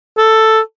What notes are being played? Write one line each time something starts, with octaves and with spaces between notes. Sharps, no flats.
A4